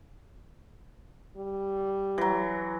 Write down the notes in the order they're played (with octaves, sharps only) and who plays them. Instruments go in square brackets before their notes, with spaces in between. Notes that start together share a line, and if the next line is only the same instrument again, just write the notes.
[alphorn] G3
[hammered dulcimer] E3 F#3